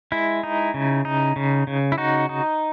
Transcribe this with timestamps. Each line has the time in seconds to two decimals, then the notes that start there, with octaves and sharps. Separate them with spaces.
0.12 G#3 E4
0.43 D#4
0.74 C#3
1.05 D#4
1.36 C#3
1.67 C#3
1.92 E4
1.98 D#4 F#4
2.29 D#4